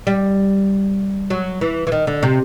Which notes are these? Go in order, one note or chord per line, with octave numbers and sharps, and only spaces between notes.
G3
F#3
E3
E3
D#3
D3
C3